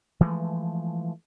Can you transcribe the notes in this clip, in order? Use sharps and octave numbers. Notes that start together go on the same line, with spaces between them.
E3 F3 G#3 A3